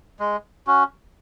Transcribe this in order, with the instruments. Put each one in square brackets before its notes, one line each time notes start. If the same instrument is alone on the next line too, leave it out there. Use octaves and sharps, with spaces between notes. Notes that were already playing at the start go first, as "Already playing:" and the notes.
[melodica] G#3
C#4 F#4